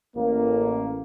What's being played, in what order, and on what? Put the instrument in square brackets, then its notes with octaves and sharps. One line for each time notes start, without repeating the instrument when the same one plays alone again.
[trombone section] A1 A#3